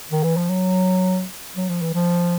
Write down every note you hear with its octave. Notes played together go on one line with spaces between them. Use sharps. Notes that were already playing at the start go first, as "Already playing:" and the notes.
D#3
E3
F3
F#3
F#3
F3
E3
F3